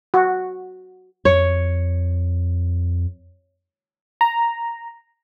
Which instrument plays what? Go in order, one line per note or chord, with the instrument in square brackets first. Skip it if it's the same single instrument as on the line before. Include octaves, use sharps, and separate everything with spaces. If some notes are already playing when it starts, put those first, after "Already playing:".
[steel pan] F#4
[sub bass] F2 [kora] C#5
[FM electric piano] A#5